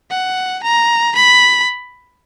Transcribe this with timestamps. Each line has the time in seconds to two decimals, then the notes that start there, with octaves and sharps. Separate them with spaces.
0.11 F#5
0.64 A#5
1.16 B5